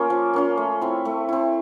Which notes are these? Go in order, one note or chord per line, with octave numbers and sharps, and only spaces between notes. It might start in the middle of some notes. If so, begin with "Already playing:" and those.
Already playing: A#3 C#4 F4
F3
A#3 C#4 F4
A3
C4 E4
A3
C4 E4